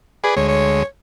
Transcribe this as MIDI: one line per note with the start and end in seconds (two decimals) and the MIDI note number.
0.24 0.33 68
0.24 0.35 71
0.24 0.35 74
0.24 0.35 80
0.36 0.83 38
0.36 0.83 56
0.36 0.46 73
0.48 0.84 73